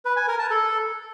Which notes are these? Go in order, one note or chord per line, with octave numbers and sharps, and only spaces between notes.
B4
G#5
A#4
A5
A4